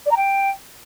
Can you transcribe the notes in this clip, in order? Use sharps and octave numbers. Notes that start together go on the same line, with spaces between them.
D5
A#5
G5